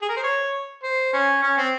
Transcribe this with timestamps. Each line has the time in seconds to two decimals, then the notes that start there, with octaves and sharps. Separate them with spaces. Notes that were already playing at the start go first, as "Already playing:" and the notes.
0.02 G#4
0.09 A#4
0.17 C5
0.24 C#5
0.83 C5
1.14 C#4
1.43 C#4
1.57 C4